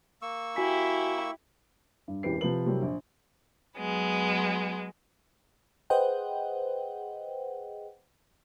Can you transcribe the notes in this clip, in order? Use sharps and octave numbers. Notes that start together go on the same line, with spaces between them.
A#3 C#6 E6
E4 F#4 G4 G#5 B6
G2
E1 A1 E3 G4 B4 C7
C3 F3 B4 F#7
C3 F#3 G3 A#3 C4 E4
A#1
F#3 G#3 B3
G#4 B4 C5 D#5 F#5 G5